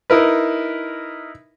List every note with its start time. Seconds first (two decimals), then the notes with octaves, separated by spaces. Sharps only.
0.10 D#4 E4 A#4 B4